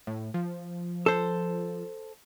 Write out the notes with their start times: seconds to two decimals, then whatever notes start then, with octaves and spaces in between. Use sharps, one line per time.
0.07 A2
0.34 F3
1.06 A4 C5